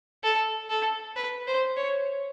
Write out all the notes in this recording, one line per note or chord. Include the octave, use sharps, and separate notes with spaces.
A4
A4
B4
C5
C#5